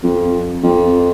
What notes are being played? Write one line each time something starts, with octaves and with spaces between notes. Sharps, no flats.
F2
F2